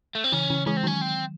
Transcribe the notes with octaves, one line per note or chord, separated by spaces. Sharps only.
A3
C4
C#3 E3 C#4
C#3 E3
E3 G#3 C#4
C4
D#3 F#3 C#4
C4